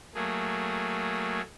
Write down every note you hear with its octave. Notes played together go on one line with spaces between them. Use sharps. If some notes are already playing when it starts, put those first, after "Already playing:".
F#3 A3 A#3 G#4